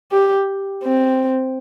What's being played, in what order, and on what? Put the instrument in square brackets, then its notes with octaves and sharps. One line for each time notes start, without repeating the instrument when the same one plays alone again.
[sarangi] G4
C4